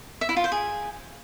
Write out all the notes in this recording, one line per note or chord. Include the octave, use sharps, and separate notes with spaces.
E5
E4
F4
C5
G#4